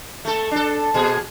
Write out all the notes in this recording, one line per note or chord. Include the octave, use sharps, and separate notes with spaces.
A3 A4
D4 A4
A#2 G#4